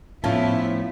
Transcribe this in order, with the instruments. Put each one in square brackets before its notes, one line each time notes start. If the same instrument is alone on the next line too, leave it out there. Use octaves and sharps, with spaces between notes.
[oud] A2 F3 [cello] B3 E4 [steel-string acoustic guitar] C#4 F4 A5